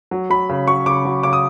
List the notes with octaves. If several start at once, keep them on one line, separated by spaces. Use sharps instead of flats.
F#3
F#3 B5
C#3
F#3 C#6
C#3 D6
F#3
C#3 D6
D#6